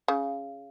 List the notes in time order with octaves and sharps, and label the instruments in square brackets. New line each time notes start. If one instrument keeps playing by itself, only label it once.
[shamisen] C#3